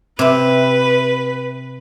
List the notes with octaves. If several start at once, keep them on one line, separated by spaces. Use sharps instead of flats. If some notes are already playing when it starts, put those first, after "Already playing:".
C3 C4 B4